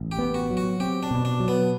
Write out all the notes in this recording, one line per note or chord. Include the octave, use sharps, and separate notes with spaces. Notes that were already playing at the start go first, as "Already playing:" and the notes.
Already playing: A1
G4
B3
F#4
F#3
F#4
C4 G4
D4
B2
D4
F#3
B3